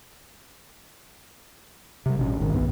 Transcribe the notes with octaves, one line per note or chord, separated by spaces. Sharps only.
C3 G3
A1 B2 C#4
G#1 G#2 D#3
C2 G2 B3